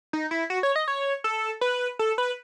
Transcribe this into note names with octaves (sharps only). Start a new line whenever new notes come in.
D#4
E4
F#4
C#5
D#5
C#5
A4
B4
A4
B4